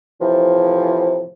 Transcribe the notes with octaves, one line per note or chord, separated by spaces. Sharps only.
A2 C3 E3 F3